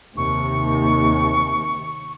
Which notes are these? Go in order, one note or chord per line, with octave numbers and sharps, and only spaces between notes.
D#2 C3 C#6